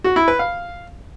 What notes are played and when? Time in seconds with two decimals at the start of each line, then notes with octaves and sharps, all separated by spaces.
0.04 F#4
0.16 E4
0.28 B4
0.39 F5